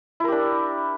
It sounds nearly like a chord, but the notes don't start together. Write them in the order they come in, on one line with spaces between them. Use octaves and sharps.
E4 A#4 G4 D4